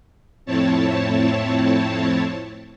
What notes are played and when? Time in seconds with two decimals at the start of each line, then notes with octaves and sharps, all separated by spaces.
0.46 F2 A2 C4 E4 C#5 A5